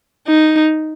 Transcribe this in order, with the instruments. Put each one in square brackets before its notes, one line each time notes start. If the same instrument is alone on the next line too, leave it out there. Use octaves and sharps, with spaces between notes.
[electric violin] D#4